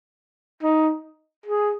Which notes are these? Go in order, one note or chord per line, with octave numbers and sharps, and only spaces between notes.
D#4
G#4